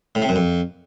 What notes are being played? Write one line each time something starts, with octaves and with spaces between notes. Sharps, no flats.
A2
C3
F#2
F2